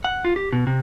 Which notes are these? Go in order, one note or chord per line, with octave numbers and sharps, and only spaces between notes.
F#5
F4
G4
B2
C3